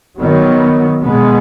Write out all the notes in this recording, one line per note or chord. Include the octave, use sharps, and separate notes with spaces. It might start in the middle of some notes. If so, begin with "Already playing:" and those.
D#3 F#3 B3
B2 G#3 B3